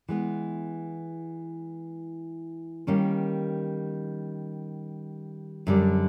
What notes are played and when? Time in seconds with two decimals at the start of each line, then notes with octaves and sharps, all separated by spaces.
0.08 E3 G#3 B3
2.87 D#3 G3 A#3 C#4
5.67 F#2 D3 G3